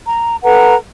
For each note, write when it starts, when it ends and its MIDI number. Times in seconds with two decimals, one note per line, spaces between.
0.07 0.36 82
0.44 0.75 69
0.44 0.75 71
0.44 0.75 78
0.44 0.75 82